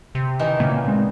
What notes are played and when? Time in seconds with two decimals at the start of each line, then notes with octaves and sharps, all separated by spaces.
0.15 C3
0.39 D#3 E3 D#4
0.60 A#2 C#3 A#3 G#5
0.88 G#3 C4